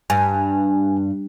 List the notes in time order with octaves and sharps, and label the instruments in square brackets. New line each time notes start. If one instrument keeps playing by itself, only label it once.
[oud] G2 [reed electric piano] G#5